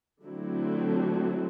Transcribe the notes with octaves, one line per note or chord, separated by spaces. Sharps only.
D3 F#3 A3 C4 E4